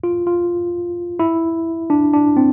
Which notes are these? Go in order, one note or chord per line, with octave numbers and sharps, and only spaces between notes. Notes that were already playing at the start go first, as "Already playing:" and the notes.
F4
F4
E4
D4
D4
C4